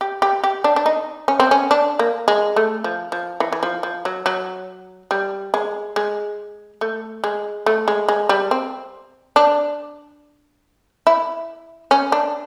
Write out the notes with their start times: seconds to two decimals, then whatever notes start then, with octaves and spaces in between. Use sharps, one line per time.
0.01 G4
0.22 G4
0.44 G4
0.64 D4
0.76 D4
0.86 D#4
1.28 C#4
1.40 C4
1.51 C#4
1.71 D4
1.99 A#3
2.28 G#3
2.56 A3
2.84 F3
3.12 F3
3.40 E3
3.53 E3
3.63 F3
3.83 F3
4.05 F#3
4.26 F#3
5.11 G3
5.54 G#3
5.96 G#3
6.81 A3
7.24 G#3
7.66 A3
7.88 G#3
8.08 G#3
8.29 G3
8.51 C4
9.36 D4
11.07 E4
11.91 C#4
12.12 D4